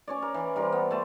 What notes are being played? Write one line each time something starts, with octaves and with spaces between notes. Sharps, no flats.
C#4 C#5 D5
A#4
E3
G3 A#4 C5
B3
A3 A5 C6